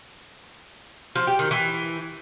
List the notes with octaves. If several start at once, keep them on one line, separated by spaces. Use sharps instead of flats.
F3
G4
D#3
E3